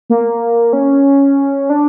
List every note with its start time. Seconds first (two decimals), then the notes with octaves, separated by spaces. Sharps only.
0.10 A#3
0.73 C#4
1.70 D4